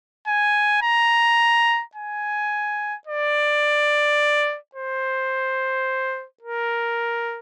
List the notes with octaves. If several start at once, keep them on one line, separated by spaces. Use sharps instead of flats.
G#5
A#5
G#5
D5
C5
A#4